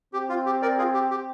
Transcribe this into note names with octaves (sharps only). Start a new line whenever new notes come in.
C4 G4
F4
G4
A#4 D5
F4 G#4
G4
G4